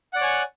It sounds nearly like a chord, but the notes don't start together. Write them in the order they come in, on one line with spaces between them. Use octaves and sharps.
F#5 D5 F#6 C#5 G#5